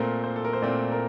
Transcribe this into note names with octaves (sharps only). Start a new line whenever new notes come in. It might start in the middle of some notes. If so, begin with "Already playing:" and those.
Already playing: A#2 A3 C4 A#4
C5
A4
A#4
C5
A#2 A3 C4 D5
A#4